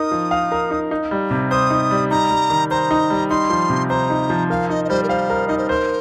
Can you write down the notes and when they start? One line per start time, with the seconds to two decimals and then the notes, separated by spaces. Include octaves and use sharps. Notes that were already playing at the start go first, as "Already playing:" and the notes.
Already playing: D#4 A#4 D#6
0.11 F3
0.31 F5
0.52 A#4
0.71 D#4
0.91 D#4
1.11 G3
1.31 C3
1.51 C5 D#6
1.70 D#4
1.91 G3
2.11 D#4 A#5
2.31 G3
2.50 D#3
2.71 C5 A#5
2.91 D#4
3.10 G3
3.30 D#4 C6
3.50 F3
3.69 C3
3.90 C5 A#5
4.10 D#4
4.30 F3
4.50 A#4 F5
4.69 D#4 D#5
4.85 D#5
4.89 G3 C5
5.03 A#4
5.09 C5 F5
5.30 A#4
5.48 D#4 D#5
5.58 C5
5.69 A#4 C5